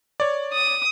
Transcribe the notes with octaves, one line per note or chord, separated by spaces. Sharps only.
C#5 D5
D#6